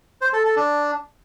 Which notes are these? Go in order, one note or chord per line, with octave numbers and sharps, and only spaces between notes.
C5
A4
A4
D4